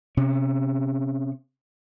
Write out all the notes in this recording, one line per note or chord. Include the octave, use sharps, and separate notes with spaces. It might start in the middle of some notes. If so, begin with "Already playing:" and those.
C3 C#4